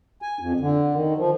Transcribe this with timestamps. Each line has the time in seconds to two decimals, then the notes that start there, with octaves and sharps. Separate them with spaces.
0.22 G#5
0.40 F2
0.60 D3
0.94 D#3
1.17 F3